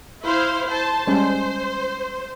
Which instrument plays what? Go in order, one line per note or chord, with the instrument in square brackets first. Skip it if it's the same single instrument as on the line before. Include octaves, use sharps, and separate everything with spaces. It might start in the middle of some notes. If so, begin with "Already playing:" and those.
[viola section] E4 C5 F5
C5 A5
[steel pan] G3 G#3 C#4 [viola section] C5